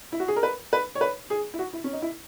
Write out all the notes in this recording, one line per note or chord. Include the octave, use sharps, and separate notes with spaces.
E4
F#4
G#4
A#4
B4
B4
C#5
B4
G#4
E4
F#4
E4
C#4
D#4
E4